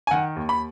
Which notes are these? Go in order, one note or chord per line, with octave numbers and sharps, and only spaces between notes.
G#5
D#3 F#5
D#2
B5